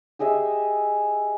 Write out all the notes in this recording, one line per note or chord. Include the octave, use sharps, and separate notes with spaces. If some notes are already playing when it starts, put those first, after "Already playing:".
G4 G#4 D#5 E5